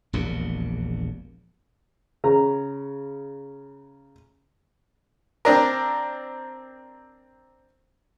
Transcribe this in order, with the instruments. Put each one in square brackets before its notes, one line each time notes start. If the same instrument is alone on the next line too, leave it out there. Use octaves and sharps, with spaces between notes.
[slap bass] E1 A#1 D#2 A#2
[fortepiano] C#3 A#5
C4 D4 A#4